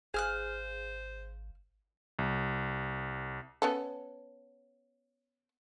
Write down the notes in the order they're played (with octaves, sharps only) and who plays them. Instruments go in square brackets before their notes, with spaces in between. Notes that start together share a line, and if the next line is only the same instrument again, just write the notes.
[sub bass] G#1 [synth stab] G#4 [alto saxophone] C5 [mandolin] F5 F6 F#6
[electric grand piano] C2
[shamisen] B3 C#4 A4